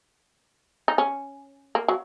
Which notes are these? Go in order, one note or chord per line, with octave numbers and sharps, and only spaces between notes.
D#4
C#4
A#3
F#3